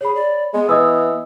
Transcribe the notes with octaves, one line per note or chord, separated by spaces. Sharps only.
G#4 C#5 B5
D5
G#3 B3
E3 D#5 D#6 E6